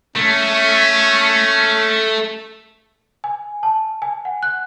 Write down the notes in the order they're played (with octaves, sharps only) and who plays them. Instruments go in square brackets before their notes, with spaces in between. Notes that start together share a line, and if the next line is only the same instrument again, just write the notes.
[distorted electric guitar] A3 [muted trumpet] C#4
[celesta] G#5
A5
G#5
F#5
F#6